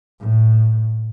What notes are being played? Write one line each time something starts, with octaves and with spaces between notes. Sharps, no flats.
A2